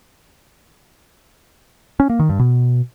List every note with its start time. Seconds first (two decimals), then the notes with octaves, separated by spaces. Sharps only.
2.00 C#4
2.10 A#3
2.19 D#3
2.29 G2
2.39 B2